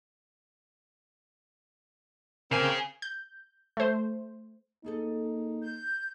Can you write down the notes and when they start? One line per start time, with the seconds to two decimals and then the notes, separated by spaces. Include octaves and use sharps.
2.52 C#3 A#3 C4 G#5
3.02 G6
3.77 A3 C5
4.85 D#2 A#3 D#4 G#4 A4
5.62 G6